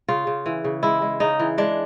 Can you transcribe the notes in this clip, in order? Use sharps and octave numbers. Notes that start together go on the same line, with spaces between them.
C#3 F4
C#3
E3
C#3
G#3 E4
G#3
C#3 D#4
E3
G#3 D4